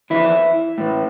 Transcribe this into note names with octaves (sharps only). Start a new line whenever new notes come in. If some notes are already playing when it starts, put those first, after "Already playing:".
F2 E3 E4
A2 E3